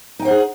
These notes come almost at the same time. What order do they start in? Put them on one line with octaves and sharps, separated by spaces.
D#4 G5 C5 F#5 G#4